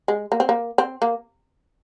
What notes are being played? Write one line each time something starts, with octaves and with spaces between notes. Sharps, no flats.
G#3
A#3
C4
A#3
C4
A#3